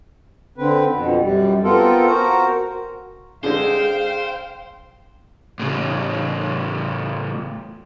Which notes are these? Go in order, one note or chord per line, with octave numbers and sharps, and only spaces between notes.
D3 C4 B4
F2 B2
F#2 G3
B3 C4 F4 A4 A#4
F#4 A#4 C5 A#5
D3 G#3 G#4 C5 F5 G5
A2 C#3